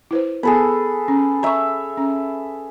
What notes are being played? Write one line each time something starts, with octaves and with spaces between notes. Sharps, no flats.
E4 B4 C5
B3 G#4 A4 B4
C#4
C#5 E5 A#5 C#6
C#4